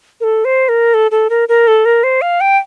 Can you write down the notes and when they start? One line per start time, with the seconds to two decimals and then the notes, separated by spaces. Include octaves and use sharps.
0.21 A#4
0.24 A4
0.45 C5
0.69 A#4
0.94 A4
1.11 A4
1.30 A#4
1.49 A#4
1.67 A4
1.85 A#4
2.04 C5
2.22 F5
2.41 G5